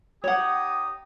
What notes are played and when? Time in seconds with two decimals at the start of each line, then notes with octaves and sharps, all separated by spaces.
0.24 D#4 G4 C#5 F#5 D#6